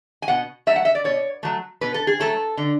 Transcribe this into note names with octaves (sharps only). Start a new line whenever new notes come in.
G#5
B2 F#5
F#3 A3 E5
F#5
E5
D5
B2 C#5
F#3 A3
B2 B4
A4
G#4
F#3 A3 A4
D3